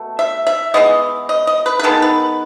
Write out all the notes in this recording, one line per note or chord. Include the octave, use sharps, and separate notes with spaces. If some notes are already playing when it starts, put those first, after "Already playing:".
Already playing: B2 A3
E5
E5
E3 G#3 B3 D#5
D#5
D#5
B4
B4
D#3 G#3 B3 A4
B4